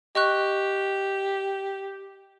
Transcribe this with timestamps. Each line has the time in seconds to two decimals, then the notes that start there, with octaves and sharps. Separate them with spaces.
0.15 G4 D#5 C#6 F#6